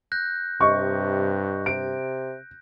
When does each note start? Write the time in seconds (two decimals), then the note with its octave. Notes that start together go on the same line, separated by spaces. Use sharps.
0.12 F#6 G6 A#6
0.61 G2 C3 D#5 C#6
1.66 C3 D7